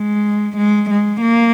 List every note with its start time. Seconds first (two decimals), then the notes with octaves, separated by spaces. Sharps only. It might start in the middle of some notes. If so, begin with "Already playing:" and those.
Already playing: G#3
0.58 G#3
0.91 G#3
1.23 A#3